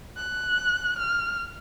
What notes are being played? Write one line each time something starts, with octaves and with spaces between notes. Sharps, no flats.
F#6
F6